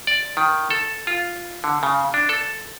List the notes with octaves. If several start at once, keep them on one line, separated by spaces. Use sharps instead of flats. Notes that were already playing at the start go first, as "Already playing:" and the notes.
D5
D#3
A4
F4
D3
C#3
D4
A4